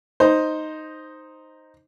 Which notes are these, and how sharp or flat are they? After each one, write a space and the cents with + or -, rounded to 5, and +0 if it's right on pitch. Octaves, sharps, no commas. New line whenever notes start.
D#4 +0 C5 +0